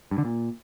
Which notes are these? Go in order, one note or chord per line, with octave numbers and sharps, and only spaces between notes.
G2
D3
A#2